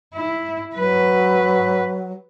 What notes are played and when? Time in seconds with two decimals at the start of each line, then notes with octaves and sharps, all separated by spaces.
0.14 E4
0.76 F#3 B4